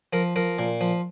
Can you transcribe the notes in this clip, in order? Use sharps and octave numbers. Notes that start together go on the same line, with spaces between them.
F3 A#4
F3 A#4
A#2
F3